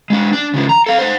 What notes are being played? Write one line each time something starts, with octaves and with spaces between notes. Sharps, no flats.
G#3 D4
D4
C#3 F3
A#5
A4 F5
C5 F#5